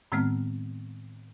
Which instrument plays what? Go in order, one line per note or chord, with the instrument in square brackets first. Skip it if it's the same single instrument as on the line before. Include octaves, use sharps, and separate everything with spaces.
[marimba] A2 D#3 G#3 B3 C4 F6